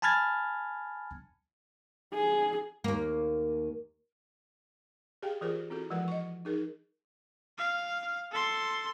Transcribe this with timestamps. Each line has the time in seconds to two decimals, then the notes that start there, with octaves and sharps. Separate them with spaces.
0.02 G#5 A5 B5 F6 G#6 A6
2.14 G#4
2.84 D#2 A#3
5.23 G4 G#4 F5 G5
5.41 E3 F4 G4 G#4 A#4 C5
5.70 C4 E4 F#4 A4
5.90 E3 F3 G#3 A#4 B4 F#5
6.08 D#5 C#6
6.45 D#4 G#4 A#4
7.58 F5
8.31 A4 C6